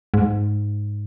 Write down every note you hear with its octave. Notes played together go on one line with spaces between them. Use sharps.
G#2